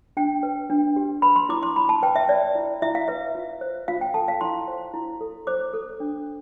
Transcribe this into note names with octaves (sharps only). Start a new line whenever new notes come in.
D4 G5
B4
D4
G4
B4 B5
C6
E4 D6
C6
E4 B5
A5
B4 G5
E5
B4 D5
E4
E4 E5
F5
B4 E5
F4
C5
F4 F5
G5
A4 A5
F5
E4 C6
C5
E4
A4
C5 D6
A4
D4